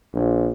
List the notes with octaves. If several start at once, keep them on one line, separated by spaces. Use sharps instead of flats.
A#1